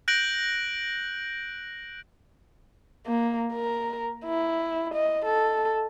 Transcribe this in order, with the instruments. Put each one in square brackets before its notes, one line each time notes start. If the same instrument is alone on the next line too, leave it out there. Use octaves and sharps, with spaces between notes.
[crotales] F#6 G6 A#6 D7 F#7
[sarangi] A#3
A#4
E4
D#5
A4